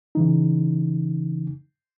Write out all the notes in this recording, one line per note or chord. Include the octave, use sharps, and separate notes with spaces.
C#3 E3 D#4